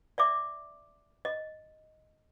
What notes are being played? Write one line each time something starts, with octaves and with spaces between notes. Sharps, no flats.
D5 E5 D6
D#5